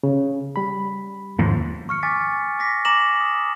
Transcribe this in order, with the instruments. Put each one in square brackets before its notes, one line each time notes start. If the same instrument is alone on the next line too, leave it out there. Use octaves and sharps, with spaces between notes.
[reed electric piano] C#3
G3 B5
[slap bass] D#2 G#2 F3
[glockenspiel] C#6 F6 C#7
G#5 D6 A6 B6
D6 A#6 B6
G#5 A#5 D6 A#6 E7 F#7
D#6